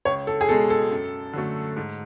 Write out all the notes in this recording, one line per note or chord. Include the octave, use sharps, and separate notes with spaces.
C#2 C#5
A4
G#4
B2 G#3 A4
A4
F#2
D3 F#3 A3
G#2